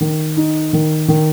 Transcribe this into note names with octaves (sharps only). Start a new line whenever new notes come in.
D#3
D#4
D#3
D#3